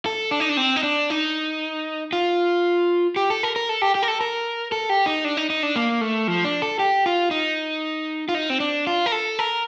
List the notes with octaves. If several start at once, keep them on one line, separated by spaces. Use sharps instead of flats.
A4
D4
D#4
D4
C4
D#4
D4
D#4
F4
G4
A4
A#4
A#4
A4
G4
G4
A#4
A4
A#4
A4
G4
D#4
D4
D#4
D#4
D4
A#3
A3
F3
D4
A4
G4
F4
D#4
F4
D#4
C4
D4
F4
A#4
A4
A#4